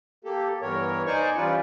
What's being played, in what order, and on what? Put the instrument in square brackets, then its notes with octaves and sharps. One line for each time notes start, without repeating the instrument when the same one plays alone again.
[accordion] A#3 G4 A4
G2 E3 B3 A#4 C#5
D#4 C5 D5 G#5 C#6
E3 G3 C#4 F4 B4 D5